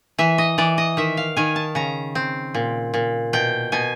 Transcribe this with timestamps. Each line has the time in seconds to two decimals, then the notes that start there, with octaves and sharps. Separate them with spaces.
0.18 E3 E5
0.38 D#5
0.58 E3 D5
0.78 D#5
0.97 D#3 E5
1.17 F5
1.37 D#3 G#5
1.56 A5
1.75 C#3 A#5
2.15 C4
2.54 A#2
2.94 A#2
3.33 B2 G5
3.72 B2 G#5